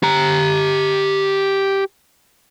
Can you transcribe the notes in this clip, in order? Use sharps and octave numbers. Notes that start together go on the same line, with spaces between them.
G4 A#5